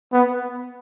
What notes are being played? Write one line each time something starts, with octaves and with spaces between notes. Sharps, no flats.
B3